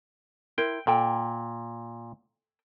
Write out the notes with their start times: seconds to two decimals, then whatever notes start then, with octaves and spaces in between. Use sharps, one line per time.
0.58 E4 A#4 C5 G5
0.87 A#2 A4 G5